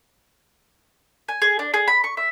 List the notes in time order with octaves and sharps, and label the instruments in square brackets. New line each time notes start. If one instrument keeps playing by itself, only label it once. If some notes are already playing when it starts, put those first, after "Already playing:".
[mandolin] G#5
G#4
D4
G#4
B5
C#6
E5